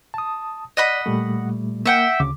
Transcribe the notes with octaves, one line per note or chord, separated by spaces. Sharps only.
A5 D#6
D5 D#5 F#5 B5
A#2 G3 A3
A#3 E5 F#5 G5
D2 C#3 D6